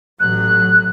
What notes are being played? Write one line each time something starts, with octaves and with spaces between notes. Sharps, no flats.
A1 F#3 F#6